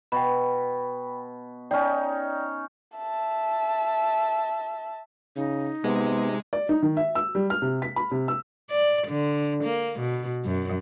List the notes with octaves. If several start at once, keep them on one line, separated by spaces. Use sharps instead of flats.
B2 G5 B5
C#4 D#4 D5 G5
E5 A5
C#3 D#4
C3 G#3 B3
D5
D#4
D#3
E5
E6
G3
F6
C3
B6
B5
C3
E6
D5
D3
A#3
B2
F#2